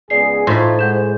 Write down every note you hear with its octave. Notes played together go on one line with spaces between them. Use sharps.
C#2 B3 G#4 D5 C7
A2 D#4 F4 C5 C6 B6
G#3 F#5 G6 E7